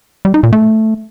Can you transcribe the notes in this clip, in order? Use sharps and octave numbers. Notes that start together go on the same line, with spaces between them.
G3
D#4
A#2
A3